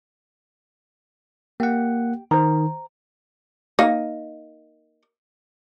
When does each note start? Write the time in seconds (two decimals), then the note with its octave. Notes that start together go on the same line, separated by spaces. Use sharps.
1.60 A#3 G4 F#5
2.31 D#3 C5 A#5
3.79 A#3 D#4